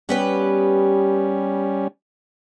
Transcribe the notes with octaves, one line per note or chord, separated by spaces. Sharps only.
G3 B3 C#4 G4 B4